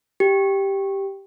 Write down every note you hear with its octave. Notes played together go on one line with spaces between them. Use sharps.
G4